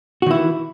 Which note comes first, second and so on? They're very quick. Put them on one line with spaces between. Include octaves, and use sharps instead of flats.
F#4 D#3 E4 E3